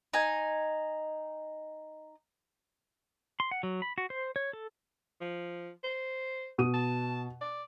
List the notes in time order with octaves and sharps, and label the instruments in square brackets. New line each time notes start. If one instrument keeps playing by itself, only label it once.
[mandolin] D#4 G#5
[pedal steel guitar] C6
F#5
F#3
B5
F#4
C5
C#5
A4
[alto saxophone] F3
C5
[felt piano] B2 D#6 D#7
[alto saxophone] A5
D5